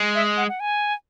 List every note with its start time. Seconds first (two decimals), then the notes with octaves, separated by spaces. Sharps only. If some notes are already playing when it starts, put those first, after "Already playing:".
Already playing: G#3
0.15 E5
0.37 F#5
0.49 F#5
0.60 G#5